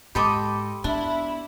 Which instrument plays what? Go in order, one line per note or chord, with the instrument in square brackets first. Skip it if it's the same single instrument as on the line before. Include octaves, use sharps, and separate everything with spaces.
[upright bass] G#2 [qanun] G4 A4 D#5 [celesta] B5 C6 D6
[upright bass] B3 [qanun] D4 [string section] E4